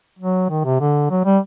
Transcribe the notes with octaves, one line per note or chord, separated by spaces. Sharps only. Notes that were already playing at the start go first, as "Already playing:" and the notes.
F#3
D#3
C3
D3
F#3
G3